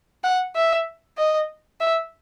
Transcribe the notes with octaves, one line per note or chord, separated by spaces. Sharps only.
F#5
E5
D#5
E5